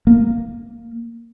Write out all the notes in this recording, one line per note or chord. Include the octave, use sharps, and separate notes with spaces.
A#3